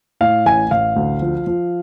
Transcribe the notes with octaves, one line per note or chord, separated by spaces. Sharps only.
A2 F5
A1 G#5
A1 F5
D2
F3
F3